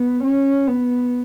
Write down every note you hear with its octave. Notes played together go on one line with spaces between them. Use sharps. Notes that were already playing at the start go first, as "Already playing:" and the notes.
Already playing: B3
C#4
B3